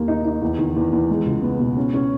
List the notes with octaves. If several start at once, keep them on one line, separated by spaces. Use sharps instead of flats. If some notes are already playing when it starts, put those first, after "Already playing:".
Already playing: D#2 A#3
D#4
D#4
E2
D#3
E2
E2
G#3
C#2
B3
B2
C#4
C#4